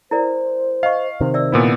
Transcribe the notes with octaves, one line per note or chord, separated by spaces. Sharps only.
E4 A#4 C5 D5
D#5 F5 C#6
C3 D#3 C5
D5 E5 E6
A#2 B3 E4